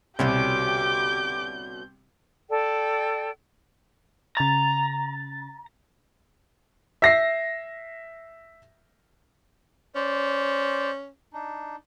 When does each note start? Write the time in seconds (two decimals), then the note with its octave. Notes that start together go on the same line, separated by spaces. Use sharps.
0.19 C2 B2 D3 C#4 G4 D6 G6
2.50 A4 D5 G5
4.37 C#3 A#5 A6
7.02 E5 A#6 C7
9.95 C#4 C5 D5
11.34 D4 D#4